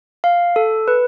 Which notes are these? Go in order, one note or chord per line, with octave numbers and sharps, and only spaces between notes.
F5
A4
B4